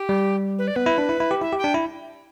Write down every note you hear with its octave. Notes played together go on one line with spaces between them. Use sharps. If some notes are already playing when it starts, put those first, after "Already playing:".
Already playing: G4
G3
B4
D5
B3 B4
E4
D4
E4
E4
G4
E4 E5
G4
G5
D4
E4